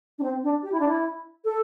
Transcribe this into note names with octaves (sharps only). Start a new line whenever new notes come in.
D4
C4
D4
G4
E4
D4
E4
A4